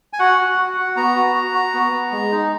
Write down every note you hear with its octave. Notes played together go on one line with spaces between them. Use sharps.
G#5
F#4 F#5
F#4
F#4
F#4
B3 A#5
F#4
F#4
F#4
B3
B3
G#3
D#4